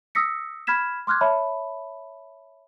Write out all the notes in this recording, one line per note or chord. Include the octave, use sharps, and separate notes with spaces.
D#6 E6 A#6 B6 C#7
B5 F6 G#6 B6 E7
C6 D6 F6 F#6 G#6
C#5 E5 A5 B5